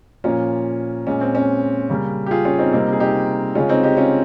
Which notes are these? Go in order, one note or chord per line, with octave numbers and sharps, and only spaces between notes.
A#2 F3 A#3 C#4 F4
A#2 G#3 C#4
C4
C#4
C#3 G3 A#3
G4
F4 G#4
C#4 F4
C4 D#4
C3 G3 A#3 C4 D#4
G#4
D#4 G4
C#3 G#3 C#4 F4
C4 D#4
D#4 G4
C#4 F4